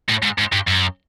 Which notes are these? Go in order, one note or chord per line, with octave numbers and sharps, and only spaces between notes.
A2
G#2
G#2
G2
F#2